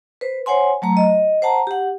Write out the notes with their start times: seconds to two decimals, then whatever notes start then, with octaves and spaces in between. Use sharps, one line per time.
0.21 B4 C5
0.46 C5 C#5 F#5 G#5 C6
0.82 F#3 A3 A#5
0.97 D#5
1.42 C5 F#5 A5 A#5
1.67 G4 F#5